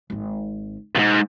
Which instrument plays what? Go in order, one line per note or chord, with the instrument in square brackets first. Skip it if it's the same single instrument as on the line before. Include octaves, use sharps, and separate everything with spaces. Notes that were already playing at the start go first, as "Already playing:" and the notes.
[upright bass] G#1 C4
[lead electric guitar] D#2 G#2 [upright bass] B2